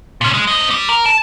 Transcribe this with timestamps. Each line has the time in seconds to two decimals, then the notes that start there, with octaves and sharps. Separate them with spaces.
0.21 A#2 C#4
0.34 G#3
0.47 C4 D#5
0.70 G3
0.89 A#4
1.06 A5